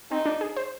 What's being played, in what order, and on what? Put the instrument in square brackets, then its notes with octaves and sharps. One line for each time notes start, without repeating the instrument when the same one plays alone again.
[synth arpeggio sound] C4 [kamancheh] D#4
[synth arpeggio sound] D4
G#4
C5